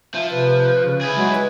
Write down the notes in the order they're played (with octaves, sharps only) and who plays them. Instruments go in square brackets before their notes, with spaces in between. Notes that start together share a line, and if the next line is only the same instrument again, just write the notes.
[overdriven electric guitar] F3 [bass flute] E5
[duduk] C3 [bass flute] B4
[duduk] C#3
[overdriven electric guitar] E4 G#4
[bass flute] F#3 [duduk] G#3
[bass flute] B4